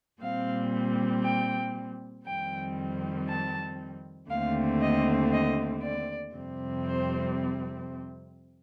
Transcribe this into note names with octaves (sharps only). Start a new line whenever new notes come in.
A#2 G3 C4 F5
G5
F2 D#3 G3 C4 G5
A5
D#2 D3 A3 C4 F5
D#5
D#5
D5
F2 C3 G3 C4
C5